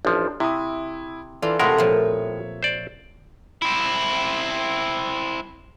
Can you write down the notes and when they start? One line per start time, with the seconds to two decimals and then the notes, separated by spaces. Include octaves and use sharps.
0.05 A1 F3 D4
0.40 C3 E4 D#6
1.42 E3 F4 A4 D5
1.59 A2 C3 G#3 A3 A#4 F#5 A5 C6
1.78 A#2 F3 C#5 E5
2.63 C5 D5
3.62 C4 E4